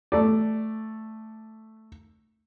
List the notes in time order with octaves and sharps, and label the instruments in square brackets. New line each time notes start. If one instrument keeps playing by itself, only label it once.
[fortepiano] A3 D5